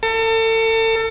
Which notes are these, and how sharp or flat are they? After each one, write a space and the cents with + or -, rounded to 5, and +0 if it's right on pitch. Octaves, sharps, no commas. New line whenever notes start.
A4 +35